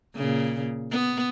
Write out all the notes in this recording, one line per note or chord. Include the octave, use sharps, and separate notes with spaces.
A#2 C#3
B3